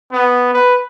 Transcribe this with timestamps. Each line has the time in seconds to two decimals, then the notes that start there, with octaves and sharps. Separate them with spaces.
0.12 B3
0.53 B4